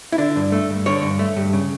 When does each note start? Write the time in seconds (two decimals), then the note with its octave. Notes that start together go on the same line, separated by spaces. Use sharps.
0.12 E4
0.18 D3 D4
0.36 G2
0.52 A3
0.70 G2
0.86 D3 C#5
1.03 G2
1.19 A3
1.37 G2
1.53 C#3